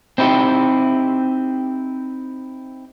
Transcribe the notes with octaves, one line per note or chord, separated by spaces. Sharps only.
C4 D#4 E4 G4